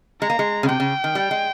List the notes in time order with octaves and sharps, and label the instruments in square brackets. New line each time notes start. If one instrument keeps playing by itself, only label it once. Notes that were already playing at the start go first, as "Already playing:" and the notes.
[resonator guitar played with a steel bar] G#3 [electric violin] A#5
[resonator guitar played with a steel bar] A#3
G#3
C#3
[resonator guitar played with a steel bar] C3 [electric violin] G5
[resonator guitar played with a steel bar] C#3
D#3
G3
G#3